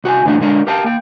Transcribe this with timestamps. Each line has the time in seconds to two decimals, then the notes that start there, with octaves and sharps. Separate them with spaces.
0.04 C2 F#4 G5 G#5
0.25 G2 D3 E3 A3 D4
0.41 D3 G#3 D4 A#4
0.67 G4 A#4 F5 G5 A5
0.84 A#3 G5